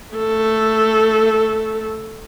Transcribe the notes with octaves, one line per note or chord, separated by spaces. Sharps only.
A3 A4